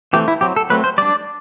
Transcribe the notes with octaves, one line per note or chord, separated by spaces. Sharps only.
E3 A3 C4 G4
E4
F#3 C4 G4
A4
F#3 A3 C4 B4
C5
G3 D4 D5